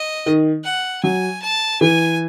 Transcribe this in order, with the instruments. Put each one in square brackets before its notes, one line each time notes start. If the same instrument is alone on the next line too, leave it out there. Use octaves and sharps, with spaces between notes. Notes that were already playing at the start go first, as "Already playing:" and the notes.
Already playing: [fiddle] D#5
[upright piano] D#3
[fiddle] F#5
[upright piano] F#3 [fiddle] G#5
[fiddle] A5
[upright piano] E3 [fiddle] G#5